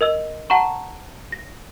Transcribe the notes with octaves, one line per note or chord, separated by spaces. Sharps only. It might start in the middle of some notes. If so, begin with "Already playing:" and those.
A#4 D#5 E6
F#5 A5 A#5 C#6
A#6